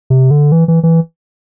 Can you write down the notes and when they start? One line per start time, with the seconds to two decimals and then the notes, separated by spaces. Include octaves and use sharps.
0.10 C3
0.31 D3
0.52 E3
0.68 E3
0.83 E3